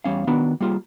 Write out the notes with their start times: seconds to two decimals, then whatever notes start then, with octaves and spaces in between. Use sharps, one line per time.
0.04 E2 G3 C#4 F5
0.27 D#3 B3 D4 F#4
0.60 G3 A#3 F4 G#4